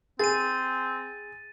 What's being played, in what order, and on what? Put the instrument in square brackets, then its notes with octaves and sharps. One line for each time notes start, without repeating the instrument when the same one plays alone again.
[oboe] C4 [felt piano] G#4 [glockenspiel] A6 D#7